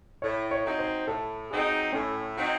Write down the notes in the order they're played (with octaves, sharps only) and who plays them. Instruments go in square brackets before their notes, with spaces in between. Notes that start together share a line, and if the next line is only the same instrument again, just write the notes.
[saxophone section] A2 [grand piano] C#5
[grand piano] C#5
[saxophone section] F#3 C4 D#4
[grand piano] C5
[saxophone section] A2 [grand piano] A4
[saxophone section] F#3 C4 D#4 [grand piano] G#4
[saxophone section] A2 [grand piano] C#4
[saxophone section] F#3 C4 D#4